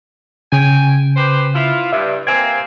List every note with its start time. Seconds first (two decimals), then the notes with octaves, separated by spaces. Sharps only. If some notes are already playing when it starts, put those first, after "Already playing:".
0.52 C#3 G5 G#5
1.16 G4 B4 C5
1.54 E4 F4
1.93 G2 E5
2.27 A#3 C4 G#5 G#6